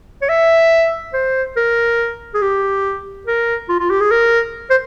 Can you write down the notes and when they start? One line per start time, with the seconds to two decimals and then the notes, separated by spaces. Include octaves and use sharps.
0.22 C#5
0.29 E5
1.13 C5
1.56 A#4
2.34 G#4
2.42 G4
3.27 A#4
3.69 F4
3.80 F4
3.90 G4
4.00 G#4
4.11 A#4
4.70 C5